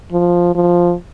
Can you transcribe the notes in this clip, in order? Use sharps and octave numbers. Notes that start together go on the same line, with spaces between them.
F3
F3